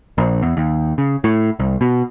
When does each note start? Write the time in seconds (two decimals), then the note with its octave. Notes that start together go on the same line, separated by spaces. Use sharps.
0.18 A#1
0.43 E2
0.57 D#2
0.98 C#3
1.24 A2
1.59 C2
1.81 B2